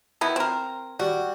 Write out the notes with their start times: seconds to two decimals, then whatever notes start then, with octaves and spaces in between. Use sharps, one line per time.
0.21 D#3 B3 E4
0.36 C4 A#4
1.00 G3 F#4